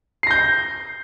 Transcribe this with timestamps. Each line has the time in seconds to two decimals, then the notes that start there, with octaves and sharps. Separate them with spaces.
0.23 C7
0.27 A#6
0.31 G6